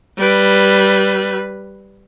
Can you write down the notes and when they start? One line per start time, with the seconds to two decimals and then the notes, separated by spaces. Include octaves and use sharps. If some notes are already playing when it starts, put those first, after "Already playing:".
0.18 G3 B4